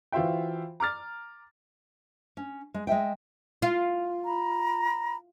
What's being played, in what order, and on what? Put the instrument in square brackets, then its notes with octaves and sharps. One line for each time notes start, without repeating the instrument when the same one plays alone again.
[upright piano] E3 F4 F#4 C5 E5 G5
A#5 D6 F6 A6
[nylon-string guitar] C#4
G#3
G#3 D#5 E5 G5
[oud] F4
[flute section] A#5 B5